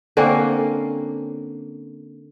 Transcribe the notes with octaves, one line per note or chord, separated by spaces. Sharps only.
D3 A#3 C4 C#4